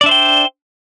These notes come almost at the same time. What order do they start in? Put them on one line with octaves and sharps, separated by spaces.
D5 D4 E5 C5 G5